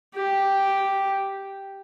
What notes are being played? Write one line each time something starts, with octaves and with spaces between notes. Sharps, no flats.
G4